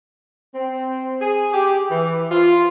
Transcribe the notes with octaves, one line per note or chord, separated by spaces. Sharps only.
C4
G#4
G4
E3
F4